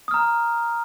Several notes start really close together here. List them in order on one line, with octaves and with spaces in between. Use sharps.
D#6 F6 A#5